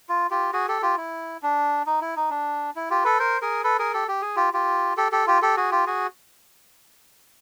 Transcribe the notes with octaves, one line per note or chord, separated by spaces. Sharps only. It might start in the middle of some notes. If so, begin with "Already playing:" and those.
F4
F4 G4
F#4 G#4
G4 A4
F4 G4
E4
D4
D#4
E4
D#4
D4
E4
F4 G4
A4 B4
A#4 C5
G#4 A#4
A4 B4
G#4 A#4
G4 A4
G4
G#4
F4 G4
F4 G4
G4 A4
G4 A4
F4 G4
G4 A4
F#4 G#4
F4 G4
F#4 G#4